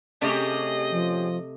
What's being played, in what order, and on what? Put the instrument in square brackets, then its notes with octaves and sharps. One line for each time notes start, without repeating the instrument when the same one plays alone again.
[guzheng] C3 A3 [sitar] C#4 G4 G#4 [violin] D#5
[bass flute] F3